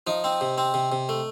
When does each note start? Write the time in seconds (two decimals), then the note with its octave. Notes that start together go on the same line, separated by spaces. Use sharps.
0.07 F3 D#4
0.24 C4
0.41 C3
0.58 C4
0.74 C3
0.92 C3
1.09 A3